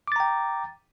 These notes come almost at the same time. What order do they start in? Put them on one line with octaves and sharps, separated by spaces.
D6 A6 A#5 G5